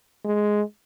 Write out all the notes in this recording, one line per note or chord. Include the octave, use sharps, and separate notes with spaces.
G#3